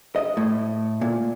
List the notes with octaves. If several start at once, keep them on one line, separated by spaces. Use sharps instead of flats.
D#5
A2
A#2